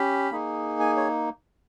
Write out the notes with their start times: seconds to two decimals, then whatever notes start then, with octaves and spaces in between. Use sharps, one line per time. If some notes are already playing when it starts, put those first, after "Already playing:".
Already playing: C#4 G4 B5
0.31 A#3 D#4 G#4
0.80 G#5
0.97 C#5